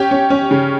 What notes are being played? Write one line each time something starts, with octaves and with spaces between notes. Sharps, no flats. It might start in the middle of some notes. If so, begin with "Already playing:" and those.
Already playing: C#4 G4
C#4
C#4
C#3